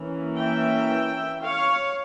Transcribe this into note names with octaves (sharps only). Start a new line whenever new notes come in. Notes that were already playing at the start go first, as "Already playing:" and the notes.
Already playing: E3 A#3 C#4
E5 G5
C#5 F5